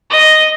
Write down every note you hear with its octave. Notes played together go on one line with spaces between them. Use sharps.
D#5